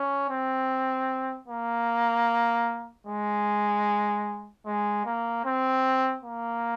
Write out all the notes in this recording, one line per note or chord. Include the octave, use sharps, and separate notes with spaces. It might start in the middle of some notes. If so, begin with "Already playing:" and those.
Already playing: C#4
C4
A#3
G#3
G#3
A#3
C4
A#3